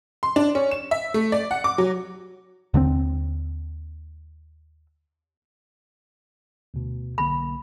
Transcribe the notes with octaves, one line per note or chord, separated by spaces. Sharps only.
C6
D4
C#4
E7
E5
A3
D5
F#5
D6
F#3
D#2 D3 G3 C4
D2 B2
B1 D3 A#3 B5